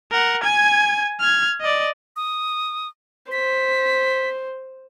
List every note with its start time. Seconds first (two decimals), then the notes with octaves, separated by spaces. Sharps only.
0.12 A#4 F#5
0.43 G#5 G#6
1.20 F6 G#6
1.61 D5 D#5
2.16 D#6
3.32 C5 B6